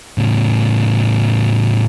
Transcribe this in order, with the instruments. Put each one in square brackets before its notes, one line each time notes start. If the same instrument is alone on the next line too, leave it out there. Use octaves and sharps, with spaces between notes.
[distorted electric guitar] A2 C#3